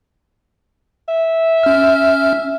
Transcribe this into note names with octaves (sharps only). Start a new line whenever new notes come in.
E5
C#4 F6